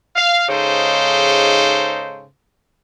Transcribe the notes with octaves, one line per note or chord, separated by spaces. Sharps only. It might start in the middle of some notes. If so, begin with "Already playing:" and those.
F5
G#2 C#3 D#4 A4 C5